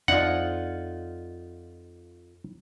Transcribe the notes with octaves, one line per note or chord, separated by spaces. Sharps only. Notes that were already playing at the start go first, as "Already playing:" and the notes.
F2 D#4 F4 F#4 D5 E5 F#5